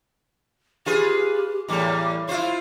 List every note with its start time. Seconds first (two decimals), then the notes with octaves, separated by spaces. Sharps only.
0.86 F4 G4 G#4 B4
1.68 E2 A2 G3 D6
2.29 E4 F4 C5 F5